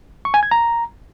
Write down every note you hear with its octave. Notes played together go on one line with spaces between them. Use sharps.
C#6
G#5
G#6
A#5